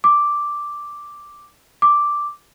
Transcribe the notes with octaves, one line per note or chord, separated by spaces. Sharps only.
D6
D6